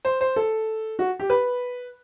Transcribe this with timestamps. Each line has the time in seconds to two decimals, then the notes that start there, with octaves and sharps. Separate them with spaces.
0.05 C5
0.21 C5
0.36 A4
0.99 F#4
1.20 G4
1.30 B4